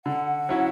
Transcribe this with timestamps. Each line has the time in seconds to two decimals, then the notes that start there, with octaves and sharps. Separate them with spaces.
0.05 D3 F#5
0.49 F#3 C#4 E4